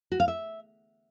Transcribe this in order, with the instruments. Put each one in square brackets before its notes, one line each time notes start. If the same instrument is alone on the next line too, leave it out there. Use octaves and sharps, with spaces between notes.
[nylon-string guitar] F#4
F5
E5